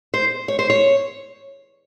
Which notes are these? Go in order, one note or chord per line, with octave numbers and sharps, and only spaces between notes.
C5
C#5
C5
C#5